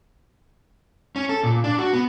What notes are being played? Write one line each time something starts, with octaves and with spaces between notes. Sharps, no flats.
C#4
A4
A#2
D4
F#4
B3